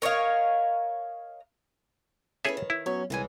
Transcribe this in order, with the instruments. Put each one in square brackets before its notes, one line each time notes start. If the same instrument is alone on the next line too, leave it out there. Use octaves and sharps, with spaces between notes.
[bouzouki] A#4 C#5 D#5 F5
[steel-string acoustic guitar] C#4 E4 B4 [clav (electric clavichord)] G#4 A4 E5
[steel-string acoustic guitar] D#3
[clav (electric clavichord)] E4
[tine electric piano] F#3 B3 C#5 [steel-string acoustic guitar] C#4
[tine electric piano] C2 G#5 [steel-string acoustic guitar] C#3 E3 G#3